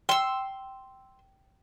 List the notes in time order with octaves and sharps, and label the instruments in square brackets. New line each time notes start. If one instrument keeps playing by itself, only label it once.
[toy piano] G5 [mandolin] C6 E6